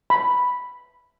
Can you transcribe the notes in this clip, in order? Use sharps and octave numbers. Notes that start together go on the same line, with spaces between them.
B5